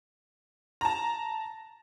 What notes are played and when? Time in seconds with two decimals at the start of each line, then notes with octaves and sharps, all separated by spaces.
0.81 A5 A#5